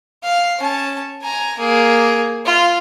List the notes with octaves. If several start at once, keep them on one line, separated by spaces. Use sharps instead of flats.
F5
C#4 A5
G#5 A#5
A#3 G#4
F4